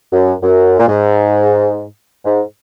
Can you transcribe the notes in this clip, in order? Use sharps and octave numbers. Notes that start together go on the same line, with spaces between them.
F#2
F#2
A#2
G#2
G#2